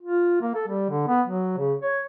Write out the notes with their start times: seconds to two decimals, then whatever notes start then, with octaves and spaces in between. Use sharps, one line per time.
0.02 F4
0.41 A#3
0.55 A4
0.68 G3
0.90 D3
1.08 B3
1.27 F#3
1.58 C#3
1.83 C#5